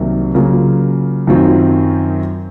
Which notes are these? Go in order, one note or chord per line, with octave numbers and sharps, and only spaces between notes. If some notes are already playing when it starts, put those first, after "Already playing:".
Already playing: C2 C3 D#3 F#3 A#3
C#3 F#3 A#3 F4
F#2 D#3 F#3 C4 F4